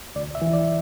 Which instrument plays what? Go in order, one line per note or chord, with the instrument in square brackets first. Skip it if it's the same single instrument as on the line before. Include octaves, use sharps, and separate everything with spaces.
[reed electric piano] D2 D5
E5
E3
D5